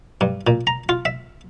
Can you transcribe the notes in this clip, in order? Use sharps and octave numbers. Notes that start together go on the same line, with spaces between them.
G2
A#2
A#5
F4
E5